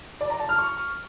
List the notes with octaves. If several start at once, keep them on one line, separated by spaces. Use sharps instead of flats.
D5
A#5
A5
F6
C#6